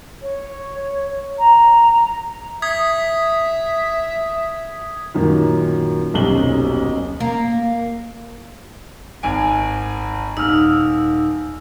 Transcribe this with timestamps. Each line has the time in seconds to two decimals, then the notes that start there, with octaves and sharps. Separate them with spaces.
0.22 C#5
1.39 A#5
2.62 E5 D#6 G#6 B6
5.14 F#2 A#2 D#3
6.14 D#1 B1 F#2 C3 F#7 G7
7.20 A#3
9.23 G#1 G#5 D7
10.37 D#1 D#4 E6 F6